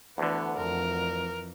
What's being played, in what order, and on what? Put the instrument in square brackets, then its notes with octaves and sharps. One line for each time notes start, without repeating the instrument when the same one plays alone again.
[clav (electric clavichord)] D2 D3 [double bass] E3 [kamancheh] B3
[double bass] F2 E3 [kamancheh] A#4